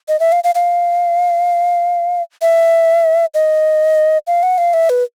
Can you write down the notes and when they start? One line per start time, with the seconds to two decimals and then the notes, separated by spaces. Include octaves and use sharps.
0.08 D#5
0.20 E5
0.32 F5
0.44 F5
0.55 F5
2.42 E5
3.34 D#5
4.27 F5
4.43 F#5
4.58 F5
4.74 E5
4.90 B4